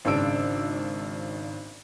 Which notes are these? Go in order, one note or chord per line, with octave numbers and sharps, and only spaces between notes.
G#1 C#3 D4 E6 D7